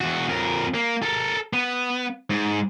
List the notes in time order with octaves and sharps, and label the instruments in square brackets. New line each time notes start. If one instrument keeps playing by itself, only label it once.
[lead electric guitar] E2 F#4
F2 A#4
A#3
A4 A#4
B3
G#2